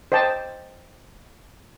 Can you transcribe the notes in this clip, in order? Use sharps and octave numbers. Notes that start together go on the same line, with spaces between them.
C5 D#5 G5 A5